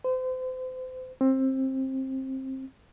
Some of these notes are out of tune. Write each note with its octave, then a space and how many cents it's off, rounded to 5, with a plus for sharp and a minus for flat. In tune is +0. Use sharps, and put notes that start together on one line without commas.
C5 -35
C4 +20